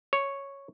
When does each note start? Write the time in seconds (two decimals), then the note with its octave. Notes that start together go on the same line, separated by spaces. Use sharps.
0.13 C#5